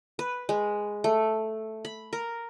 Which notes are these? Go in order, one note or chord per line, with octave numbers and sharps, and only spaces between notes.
B4
G#3
A3
B5
A#4